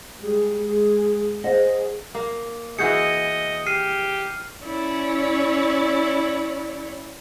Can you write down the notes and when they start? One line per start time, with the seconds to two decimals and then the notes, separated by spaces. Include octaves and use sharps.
0.21 G3 G#3 G#4
0.63 G#3 G#4
1.44 G#4 C5 D#5 F#5
2.15 A#3
2.79 E3 F#4 G#4 D#5 G6 C#7
3.66 G4 F6 C7 D#7
4.63 C#4 E4 C#5 D5